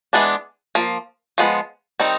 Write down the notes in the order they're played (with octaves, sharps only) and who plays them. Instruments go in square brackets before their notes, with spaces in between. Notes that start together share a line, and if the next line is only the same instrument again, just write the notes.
[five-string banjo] E3 G#3 B3 D4
F3 A#3
F3 G#3 B3
D#3 G3 C4 D#4